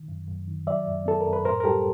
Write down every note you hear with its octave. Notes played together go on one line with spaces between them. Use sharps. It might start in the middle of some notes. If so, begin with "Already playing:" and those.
Already playing: D#3
F#2
F#2
D#3
F#3 D5 E5
F#2
B3 A4
A#4
F#2
B4
A2 A#4 C5
A#4
G3 G4 A4